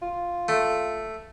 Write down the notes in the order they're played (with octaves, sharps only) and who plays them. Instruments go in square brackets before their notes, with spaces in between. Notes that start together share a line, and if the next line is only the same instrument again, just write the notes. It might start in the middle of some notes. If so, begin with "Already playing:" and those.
[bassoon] F4
[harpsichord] A3